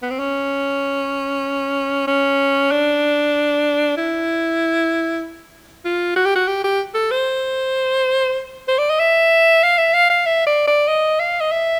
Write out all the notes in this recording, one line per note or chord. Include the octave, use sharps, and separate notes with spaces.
B3
C4
C#4
C#4
D4
E4
F4
F#4
G4
F#4
G4
G4
A4
C5
C5
D5
D#5
E5
F5
E5
F5
F5
E5
D5
D5
D#5
F5
D#5
E5